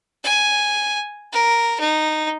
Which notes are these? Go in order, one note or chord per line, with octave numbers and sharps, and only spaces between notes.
G#5
A#4
D#4